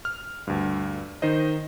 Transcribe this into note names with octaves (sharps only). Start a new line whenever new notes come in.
F6
D2 G2
D#3 D#4 C5 D#5